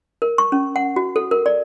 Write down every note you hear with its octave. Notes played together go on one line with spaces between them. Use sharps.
A#4
C#6
C#4
F#5
F#4
A4
A#4
D5